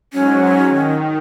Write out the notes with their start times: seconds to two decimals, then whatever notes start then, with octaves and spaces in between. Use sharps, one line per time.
0.13 G#2 F#3 C#4
0.67 D#3